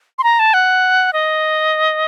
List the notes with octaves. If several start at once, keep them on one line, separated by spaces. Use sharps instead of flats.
C6
A#5
A5
F#5
D#5